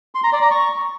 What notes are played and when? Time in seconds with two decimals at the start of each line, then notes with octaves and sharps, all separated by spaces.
0.15 C6
0.24 A#5
0.33 D5
0.42 A#5
0.51 C#6